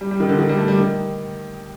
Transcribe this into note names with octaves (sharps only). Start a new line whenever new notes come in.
G3
G3
D#3
D3
D#3
G3
A3
G3
D#3